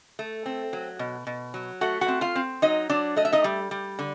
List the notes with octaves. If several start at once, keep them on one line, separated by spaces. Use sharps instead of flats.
A3
C4
F#3
B2
B2
F#3
A3 F#4 F#5
F#4 F#5
C4
F4 F5
C4
F#3 D#4 D#5
F#3 D4 D5
A3 D#5
E5
D#4 D#5
G3
G3
D3